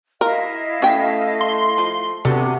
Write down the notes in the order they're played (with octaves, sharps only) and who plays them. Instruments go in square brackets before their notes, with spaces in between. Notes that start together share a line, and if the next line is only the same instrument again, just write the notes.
[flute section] E4 D#5 F5 [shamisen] A#4
[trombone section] A3 [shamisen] C#4 E5 G5
[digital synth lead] C6
[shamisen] F3
[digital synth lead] C3 [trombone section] B3 D4 F#4 [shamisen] A4 [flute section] F#5